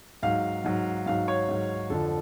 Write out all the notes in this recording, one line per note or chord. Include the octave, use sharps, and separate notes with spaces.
G#2 F#3 F5
G#2 F#3
G#2 F#3 F5
C#5
G#2 F#3
F2 D3 F3 A4